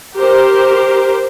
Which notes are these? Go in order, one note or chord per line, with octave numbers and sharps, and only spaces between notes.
G4 A#4 C5